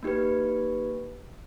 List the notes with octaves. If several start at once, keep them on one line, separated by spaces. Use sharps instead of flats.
A#3 D#4 G4 B4